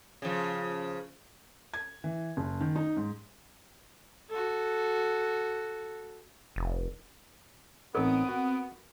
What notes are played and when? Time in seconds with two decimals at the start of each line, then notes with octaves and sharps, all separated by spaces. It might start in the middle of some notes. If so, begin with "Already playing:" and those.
0.22 C#3 F3
1.74 G#6
2.04 E3
2.37 F#1
2.61 D#3
2.76 D#4
2.97 G#2
4.29 F#4 A4
6.56 F1
7.95 A1 B3 C4 D#4 A#4 C#5 D#6 D7
8.29 F#4